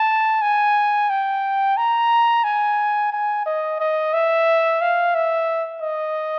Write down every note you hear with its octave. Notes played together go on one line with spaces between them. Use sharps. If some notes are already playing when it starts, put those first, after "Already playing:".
Already playing: A5
G#5
G5
A#5
G#5
G#5
D#5
D#5
E5
F5
E5
D#5